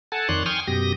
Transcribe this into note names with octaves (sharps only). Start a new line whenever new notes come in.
A4 F#5 G#5 A5
F2 D#3 C#5 D5 C6 F#6
G5 G#5 C6 C#6 D#6 F6
F#2 B2 G4 D#6 A#6